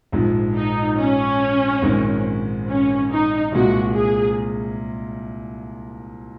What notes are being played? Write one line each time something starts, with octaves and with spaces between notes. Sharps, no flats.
A#1 G#2 F3 G#3
D#4
C#4
A#1 G#2 D#3 G#3 C4
C#4
D#4
C2 A#2 G#3 F#4
G#4